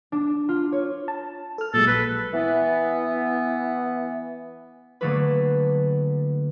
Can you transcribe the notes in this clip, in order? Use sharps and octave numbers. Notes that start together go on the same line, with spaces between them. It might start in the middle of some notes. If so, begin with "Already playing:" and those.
D4
F4
C#5
A5
A4 F6
A#2 F#3 G#3 A4
A#1 B4
E3 B3
D3 F#3 A3 A#3 G#4 B4